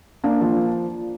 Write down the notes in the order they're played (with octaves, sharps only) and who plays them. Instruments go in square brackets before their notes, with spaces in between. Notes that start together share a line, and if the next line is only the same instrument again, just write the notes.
[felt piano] A#3 D4
F3